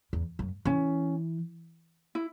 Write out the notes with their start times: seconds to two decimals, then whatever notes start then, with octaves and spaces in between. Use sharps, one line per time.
0.13 E2
0.39 F#2
0.65 E3 C#4
2.15 E4